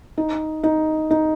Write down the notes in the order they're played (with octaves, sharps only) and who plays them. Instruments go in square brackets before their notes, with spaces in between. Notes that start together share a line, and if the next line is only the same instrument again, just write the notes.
[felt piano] D#4
D#4
D#4